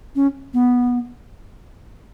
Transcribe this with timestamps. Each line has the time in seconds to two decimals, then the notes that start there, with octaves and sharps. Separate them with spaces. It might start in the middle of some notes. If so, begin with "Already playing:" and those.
0.15 C#4
0.54 B3